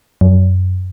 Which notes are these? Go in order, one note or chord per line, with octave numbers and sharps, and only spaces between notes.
F#2